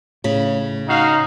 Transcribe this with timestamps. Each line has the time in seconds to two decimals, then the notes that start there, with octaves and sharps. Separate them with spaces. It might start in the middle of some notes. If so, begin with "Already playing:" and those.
0.24 A2 C#3 B5
0.88 D#4 F#4 F5